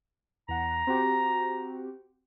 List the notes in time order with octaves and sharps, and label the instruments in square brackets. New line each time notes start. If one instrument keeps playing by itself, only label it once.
[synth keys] E2 F#5 [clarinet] A#5
[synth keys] C4 F#4 G4